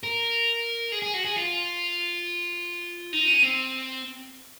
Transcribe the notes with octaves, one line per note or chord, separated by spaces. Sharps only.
A#4
G#4
G#4
F#4
G#4
F4
D#4
C#4
C4